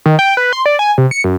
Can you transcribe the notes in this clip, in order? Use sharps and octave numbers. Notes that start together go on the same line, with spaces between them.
D#3
G5
B4
C6
D5
G#5
C3
C#7
F#2